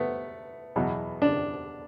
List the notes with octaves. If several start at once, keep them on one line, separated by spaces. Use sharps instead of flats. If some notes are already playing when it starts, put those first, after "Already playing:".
Already playing: A3 B3
E2 B2 F#3
D4